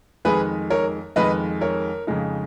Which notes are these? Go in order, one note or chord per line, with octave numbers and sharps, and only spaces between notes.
F2 D#3 G#3 G#4 B4
A#4 C#5
F2 D#3 G#3 B4 D#5
A#4 C#5
F2 C#3 G#3 D#4